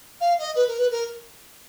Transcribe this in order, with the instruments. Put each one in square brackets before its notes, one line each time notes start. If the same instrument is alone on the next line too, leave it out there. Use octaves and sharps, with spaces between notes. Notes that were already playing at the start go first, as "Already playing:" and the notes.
[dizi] F5
D#5
B4
A#4
B4
A#4